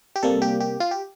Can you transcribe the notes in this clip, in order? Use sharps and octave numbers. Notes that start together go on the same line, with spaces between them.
G4
C3 G3 A#3 A4
G4
G4
F4
G4